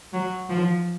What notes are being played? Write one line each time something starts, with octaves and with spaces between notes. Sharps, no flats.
F#3
F3